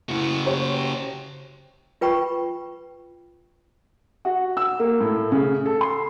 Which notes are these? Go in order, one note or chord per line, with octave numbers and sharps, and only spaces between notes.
A2 C#3 F#4 C#7
G4 C5 C#5
F4 B4 G5 B5 C#6
F#4
E6
A#3
A2
C#3
A4
C6